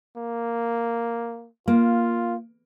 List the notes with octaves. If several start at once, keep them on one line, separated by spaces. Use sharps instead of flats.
A#3
A#3 F4